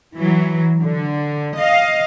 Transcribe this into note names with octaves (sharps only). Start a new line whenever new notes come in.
E3 F#3
D3
D#5 F5